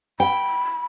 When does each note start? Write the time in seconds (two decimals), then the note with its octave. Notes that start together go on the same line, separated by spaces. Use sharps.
0.20 G5 B5